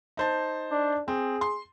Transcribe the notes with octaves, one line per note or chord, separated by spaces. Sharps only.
D#4 C5 A5
D4
C4 G#4
C6